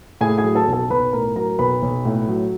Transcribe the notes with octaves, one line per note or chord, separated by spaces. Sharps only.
A2 G#4 G#5
G#4 G#5
F#3
A4 A5
B1
A4 A5
B1 B4 B5
A2 A#4 A#5
F#3 A#4 A#5
B1 B4 B5
B1
A2
F#3